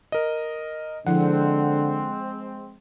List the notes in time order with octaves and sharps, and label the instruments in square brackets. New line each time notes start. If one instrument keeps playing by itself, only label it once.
[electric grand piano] A#4 D#5
[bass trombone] D3 [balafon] F3 E4 [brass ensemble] G#3 C4 [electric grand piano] F#5